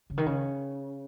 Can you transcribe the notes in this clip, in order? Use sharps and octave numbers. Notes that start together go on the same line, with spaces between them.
C#3
D#3
C#3